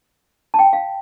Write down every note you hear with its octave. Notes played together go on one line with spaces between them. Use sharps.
A5
G5
F5